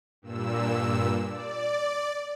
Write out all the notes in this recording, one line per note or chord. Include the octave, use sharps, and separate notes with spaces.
G2 A#2 E6
D5